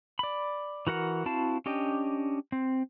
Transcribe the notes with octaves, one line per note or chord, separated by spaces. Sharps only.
D5 B5
E3 F#4 A#4 F#5
C4 E4 F#4 F5 A5
C#4 D4 G4 D#5 G5
C4